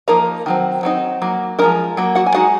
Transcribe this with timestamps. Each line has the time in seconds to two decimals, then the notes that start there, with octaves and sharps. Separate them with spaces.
0.08 F3 A#3 D#4 A#4 A#5
0.46 D#3 F#3 C4
0.83 F#3 C4 D#4
1.22 F#3 A#3
1.59 F3 G#3 D#4 A#4 A#5
1.97 F#3 A#3
2.15 F#4 F#5
2.26 G#5
2.34 G#3 D#4 F#4 F#5